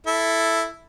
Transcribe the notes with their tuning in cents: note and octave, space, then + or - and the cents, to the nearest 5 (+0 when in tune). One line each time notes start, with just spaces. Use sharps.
E4 +0 A4 +0